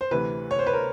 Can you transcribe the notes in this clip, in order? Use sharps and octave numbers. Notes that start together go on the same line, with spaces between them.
C5
D2 C3 E3 B4
C#5
C5
B4
A#4